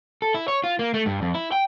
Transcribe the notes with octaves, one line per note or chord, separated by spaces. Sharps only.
A4
E4
C#5
F4
A#3
A3
G2
F2
E4
G5